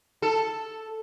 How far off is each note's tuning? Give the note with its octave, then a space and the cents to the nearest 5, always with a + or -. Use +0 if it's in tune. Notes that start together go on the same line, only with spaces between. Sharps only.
A4 +0